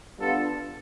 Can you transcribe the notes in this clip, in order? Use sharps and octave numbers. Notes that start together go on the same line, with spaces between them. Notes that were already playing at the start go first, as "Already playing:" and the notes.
G3 B3 D4 F4 A4